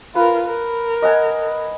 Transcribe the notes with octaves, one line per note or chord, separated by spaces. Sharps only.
F4 A#4 B4
A#4
D#5 F#5 G#5